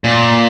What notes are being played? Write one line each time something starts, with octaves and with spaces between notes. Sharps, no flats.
A#2